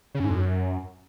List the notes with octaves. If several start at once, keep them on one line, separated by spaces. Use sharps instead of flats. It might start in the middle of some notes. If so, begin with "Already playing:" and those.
C#3
F#2
G#2
F2
F#2